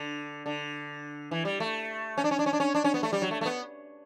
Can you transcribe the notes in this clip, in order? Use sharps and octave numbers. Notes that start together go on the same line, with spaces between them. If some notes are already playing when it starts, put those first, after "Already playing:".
Already playing: D3
D3
E3
G3
A3
C#4
D4
C#4
D4
C#4
D4
C#4
D4
C#4
B3
A3
G3
F#3
A3
A3
B3